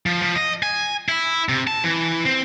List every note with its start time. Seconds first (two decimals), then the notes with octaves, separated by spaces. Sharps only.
0.06 F3
0.22 F3
0.35 D#5
0.63 G#5
1.09 E4
1.49 C3
1.67 A5
1.84 E3
2.25 C4